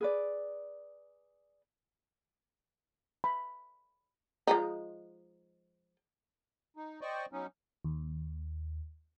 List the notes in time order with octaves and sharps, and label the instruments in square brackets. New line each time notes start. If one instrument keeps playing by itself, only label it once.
[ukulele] G#4 B4 D5
[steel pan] B5
[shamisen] F3 G#3 D#4
[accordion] D#4
C5 D5 D#5 G5 C#6
F#3 B3 C#4 D#4
[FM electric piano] D#2